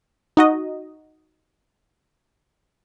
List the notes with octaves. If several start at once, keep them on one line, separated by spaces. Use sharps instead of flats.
D#4 F#4 D#5